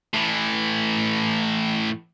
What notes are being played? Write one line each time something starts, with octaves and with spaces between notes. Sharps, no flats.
A2 E3